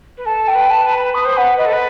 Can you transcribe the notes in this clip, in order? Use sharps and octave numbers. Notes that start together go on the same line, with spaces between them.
B4
A4 A5
G5
B4
A5
B4
B5
B4 D#6
C5
B4 F#5
B4 D#5
A4
B4